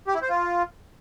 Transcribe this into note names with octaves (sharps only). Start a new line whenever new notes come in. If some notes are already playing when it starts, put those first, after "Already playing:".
G4
E4
C5
F4